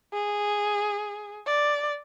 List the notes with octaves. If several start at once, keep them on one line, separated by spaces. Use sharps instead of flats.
G#4
D5